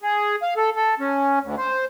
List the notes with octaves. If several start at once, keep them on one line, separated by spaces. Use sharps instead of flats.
G#4
F5
A4
A4
C#4
D2
C5